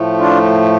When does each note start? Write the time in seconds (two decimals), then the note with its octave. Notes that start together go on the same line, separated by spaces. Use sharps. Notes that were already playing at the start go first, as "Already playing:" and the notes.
Already playing: A2 F3 A3
0.19 D4 F4